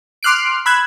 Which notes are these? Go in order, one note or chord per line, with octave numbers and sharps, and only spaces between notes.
C6 D6 F6 F#6 C7 D7
B5 E6 F#6 G#6